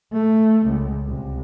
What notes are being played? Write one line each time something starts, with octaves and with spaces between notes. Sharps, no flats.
A3
C#2
C2